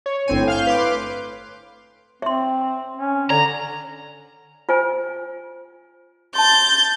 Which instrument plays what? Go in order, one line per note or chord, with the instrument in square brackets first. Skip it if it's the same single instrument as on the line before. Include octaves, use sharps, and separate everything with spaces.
[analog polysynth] C#5
[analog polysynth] G1 C4 G#5 [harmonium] A2
[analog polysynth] F5 F6 G6
B4 C6 D6
[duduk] C4 [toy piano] E5 C6
[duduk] C#4
[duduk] D3 [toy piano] D5 [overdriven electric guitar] A#5
[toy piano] F4 C5 G#5
[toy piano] A5 C6 [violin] G6 A6